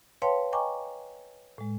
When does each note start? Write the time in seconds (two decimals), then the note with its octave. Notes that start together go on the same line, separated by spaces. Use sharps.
0.22 B4 C#5 F5 G5 A5 C6
0.52 D#5 G5 G#5 A#5 C#6 D6
1.58 A2 G#3